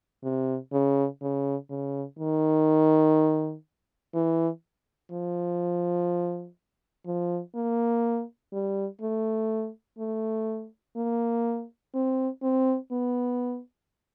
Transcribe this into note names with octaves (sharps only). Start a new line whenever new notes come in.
C3
C#3
C#3
C#3
D#3
E3
F3
F3
A#3
G3
A3
A3
A#3
C4
C4
B3